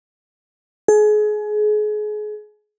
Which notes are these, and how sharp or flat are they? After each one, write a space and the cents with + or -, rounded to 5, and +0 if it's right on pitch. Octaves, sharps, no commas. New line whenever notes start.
G#4 +30